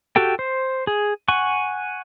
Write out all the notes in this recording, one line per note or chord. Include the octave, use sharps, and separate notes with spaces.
F#4 G4 A4 G5
C5
G#4
F#5 G#5 C#6